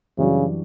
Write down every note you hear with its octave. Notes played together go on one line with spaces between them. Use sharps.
F#2 C#3 E3 G3 D4 F#4